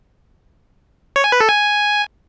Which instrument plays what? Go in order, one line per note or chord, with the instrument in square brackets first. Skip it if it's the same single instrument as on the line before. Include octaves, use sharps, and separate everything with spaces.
[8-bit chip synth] C#5
G#5
B4
A4
G#5